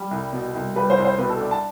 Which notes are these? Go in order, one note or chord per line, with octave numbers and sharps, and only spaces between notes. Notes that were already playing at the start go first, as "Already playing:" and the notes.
Already playing: G3
C2
B2
C2
G3 B4
C5
C2
C5
B2 B4
A4
D4
A5